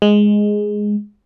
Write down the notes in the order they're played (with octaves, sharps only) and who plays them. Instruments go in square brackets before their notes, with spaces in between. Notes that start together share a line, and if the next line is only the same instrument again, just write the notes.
[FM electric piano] G#3